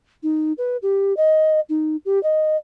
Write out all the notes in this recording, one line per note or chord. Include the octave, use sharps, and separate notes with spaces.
D#4
B4
G4
D#5
D#4
G4
D#5